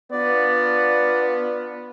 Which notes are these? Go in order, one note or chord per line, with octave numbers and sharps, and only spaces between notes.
B3 D4 F4 D5